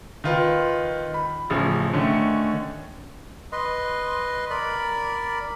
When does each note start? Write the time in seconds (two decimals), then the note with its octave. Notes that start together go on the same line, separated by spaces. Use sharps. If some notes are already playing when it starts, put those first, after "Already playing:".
0.24 D#3 F4 B4
1.14 B5
1.50 A1 C#3 F3
1.93 D3 D#3 A3 C#4
3.52 B4 D#5 C6
4.50 A#4 D5 B5